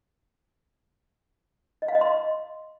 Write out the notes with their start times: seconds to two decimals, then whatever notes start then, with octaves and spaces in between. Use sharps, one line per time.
1.82 D#5
1.88 F5
1.95 D#5
2.01 C6